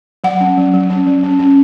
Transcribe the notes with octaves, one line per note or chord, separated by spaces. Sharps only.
F#3 F#5
C#4
F#3
F#3
C#4
F#3
C#4
C#4